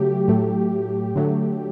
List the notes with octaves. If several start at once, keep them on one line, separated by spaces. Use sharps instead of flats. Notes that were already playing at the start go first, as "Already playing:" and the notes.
Already playing: C#3 F#3 A3 G4
A2 F#3 A3
D3 F#3 A3